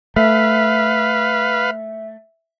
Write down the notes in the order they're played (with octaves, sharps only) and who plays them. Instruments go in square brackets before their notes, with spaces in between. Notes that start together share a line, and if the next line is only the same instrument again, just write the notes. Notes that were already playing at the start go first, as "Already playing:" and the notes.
[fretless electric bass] A3 [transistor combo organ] B4 F5 [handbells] E5